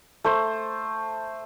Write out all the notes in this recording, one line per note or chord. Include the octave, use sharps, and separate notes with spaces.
A3 C5